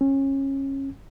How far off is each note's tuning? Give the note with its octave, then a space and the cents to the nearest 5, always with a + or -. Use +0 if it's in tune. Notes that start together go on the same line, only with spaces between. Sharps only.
C#4 -25